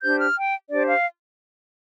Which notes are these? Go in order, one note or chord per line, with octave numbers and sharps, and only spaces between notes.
D4 G4 C5 G6
F6
G5
D4 G4 C5 D5
F5